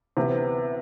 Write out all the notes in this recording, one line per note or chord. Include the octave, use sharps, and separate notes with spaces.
D2 C3 E3 B3